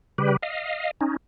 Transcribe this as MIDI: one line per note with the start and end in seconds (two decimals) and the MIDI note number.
0.18 0.37 49
0.18 0.37 55
0.18 0.37 67
0.18 0.37 71
0.42 0.91 75
0.42 0.91 77
1.01 1.16 61
1.01 1.16 63